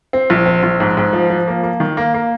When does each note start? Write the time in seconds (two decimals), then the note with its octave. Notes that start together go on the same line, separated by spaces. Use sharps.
0.13 C4
0.30 A#1
0.46 C4
0.63 A#1
0.80 G#2
0.97 G#2
1.13 F3
1.30 F3
1.48 A#3
1.63 A#3
1.80 D#3
1.97 A#3
2.14 A#3